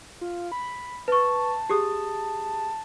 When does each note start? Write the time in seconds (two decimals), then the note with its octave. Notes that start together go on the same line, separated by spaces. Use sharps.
0.21 F4
0.52 B5
1.08 B4 A5 C#6
1.69 G4 G#4 D#6